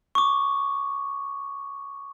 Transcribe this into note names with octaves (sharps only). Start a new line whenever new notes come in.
C#6 D6